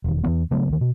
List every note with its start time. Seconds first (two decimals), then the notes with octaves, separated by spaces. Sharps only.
0.04 E1 D#3
0.24 E2 E3 B3
0.51 C#3 F#3 A3 B3
0.69 D2 D#3
0.81 B2